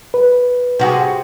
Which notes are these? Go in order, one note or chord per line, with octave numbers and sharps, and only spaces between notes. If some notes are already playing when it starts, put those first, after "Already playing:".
B4
C3 F#4 G#4